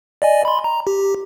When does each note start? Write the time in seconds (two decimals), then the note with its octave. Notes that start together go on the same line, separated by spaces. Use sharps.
0.22 D5 D#5 G#5
0.45 B5 C6
0.64 A#5
0.87 G4